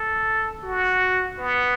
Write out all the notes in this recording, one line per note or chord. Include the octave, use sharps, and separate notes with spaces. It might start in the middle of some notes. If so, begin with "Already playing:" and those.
Already playing: A4
F#4
B3